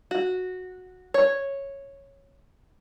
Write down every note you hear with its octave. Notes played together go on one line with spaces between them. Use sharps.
F#4
C#5